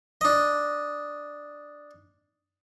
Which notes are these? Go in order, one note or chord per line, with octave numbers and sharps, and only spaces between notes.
D4 D#5